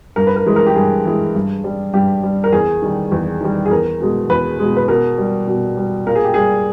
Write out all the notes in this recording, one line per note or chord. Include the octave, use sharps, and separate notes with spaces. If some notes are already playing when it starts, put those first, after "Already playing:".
G2 A#4
B4
A#4
E3 G#3
A#4
G4
G2 G#4
E3 G#3
G2
G3
G2 G4
G3
A#4
E2 G#4
D#3 G3
E2
D#3 G3
G#4
E2 A#4
B2 G#3
E2 B4
B2 G#3
B4
B2 A#4
G3
B2
G3
A#2 A#4
G#4
G4
G3 G#4